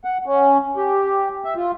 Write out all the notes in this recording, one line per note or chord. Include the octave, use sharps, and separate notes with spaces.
F#5
C#4
G4
E5
F4